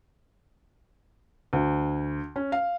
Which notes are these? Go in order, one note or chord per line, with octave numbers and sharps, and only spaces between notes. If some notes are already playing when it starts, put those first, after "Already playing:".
D2
C#4
F5